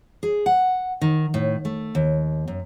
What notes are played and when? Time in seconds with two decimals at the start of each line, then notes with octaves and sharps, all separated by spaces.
0.23 G#4
0.46 F#5
1.01 D#3
1.34 A2
1.65 A3
1.95 D#2
2.48 F#2